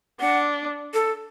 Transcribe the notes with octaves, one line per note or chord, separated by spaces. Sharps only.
D4 F#5
A4